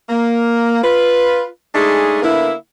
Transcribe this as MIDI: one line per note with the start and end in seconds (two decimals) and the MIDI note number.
0.09 0.83 58
0.83 1.47 65
0.83 1.47 71
1.75 2.20 56
1.75 2.20 57
1.75 2.20 62
1.75 2.20 63
1.75 2.20 68
2.22 2.53 50
2.22 2.53 58
2.22 2.53 59
2.22 2.53 64